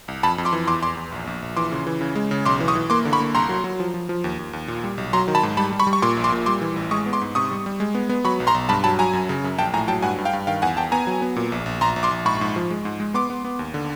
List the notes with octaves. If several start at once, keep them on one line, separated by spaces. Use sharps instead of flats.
C2
F2 A5 B5
F2
C6 D6
E3
E2 C6 D6
E2 C6 D6
E2
A#1
A#1
A#1
E3 C6 D6
C#3
E3
C#3
G#3
C#3
B1 C6 D6
E3
C#6 D#6
E3
A#3 C6 D6
D3
B5 C#6
A#3
C2 A#5 C6
F#3
F#3
F3
F3
F3
D#2
D#2
D#2
A#2
G3
B1
F#3 A#5 C6
D#3
A5 B5
G#2
G3 A5 B5
G3
B5 C#6
G3
C#6
A#2 C6 D6
A#1
C6 D6
A#2
G3 C6 D6
E3
A1
G#3 C#6 D#6
B3
C6 D6
G#2
C3 C#6 D#6
G3
G3
G#3
B3
B3
F#3 B5 C#6
B1
A#5 C6
B1
G2 A5 B5
F#3 A5 B5
F#3 G#5 A#5
F#2
C#3
F#2
A#1 G5 A5
A2 G#5 A#5
F#3 G5 A5
G2 F#5 G#5
G2
F5 G5
G2
D#3 F5 G5
E2 F#5 G#5
E2 G5 A5
B3 G#5 A#5
F#3
B3
A#2
A#1
A#1
A#1 A#5 C6
A#1
C6 D6
A#1
G#2 B5 C#6
G#2
F3
G#3
G#2
G#3
B3 C6 D6
B3
B3
D#2
D3